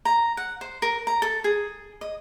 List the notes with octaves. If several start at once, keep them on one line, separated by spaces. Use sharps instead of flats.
A#5
F#5
C5
A#4
A#5
A4
G#4
D#5